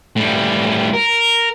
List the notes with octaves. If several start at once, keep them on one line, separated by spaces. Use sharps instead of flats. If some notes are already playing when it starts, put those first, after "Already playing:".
A2 G3
A#4